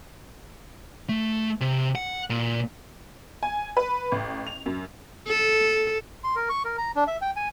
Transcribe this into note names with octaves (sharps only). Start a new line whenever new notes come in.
A3
C3
F#5
A#2
G#5
B4
A1
F7
F#2
A4
C6
A#4
C#6
A#4
A#5
D4
E5
G5
G#5